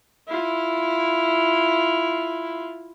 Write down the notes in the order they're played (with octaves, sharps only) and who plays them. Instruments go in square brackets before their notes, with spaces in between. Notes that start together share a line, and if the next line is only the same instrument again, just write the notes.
[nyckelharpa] E4 F4